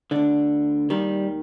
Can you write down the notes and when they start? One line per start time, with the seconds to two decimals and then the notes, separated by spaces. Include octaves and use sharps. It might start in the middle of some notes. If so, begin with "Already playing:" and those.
0.11 D2 D3 D4
0.90 D#2 D#3 G3